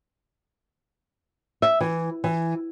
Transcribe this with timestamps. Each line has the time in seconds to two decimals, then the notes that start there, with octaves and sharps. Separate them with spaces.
1.62 E5
1.81 E3
2.24 E3